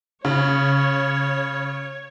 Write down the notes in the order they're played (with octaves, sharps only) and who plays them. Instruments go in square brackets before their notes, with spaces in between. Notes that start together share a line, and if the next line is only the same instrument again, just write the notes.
[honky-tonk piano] C#3 [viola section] C#5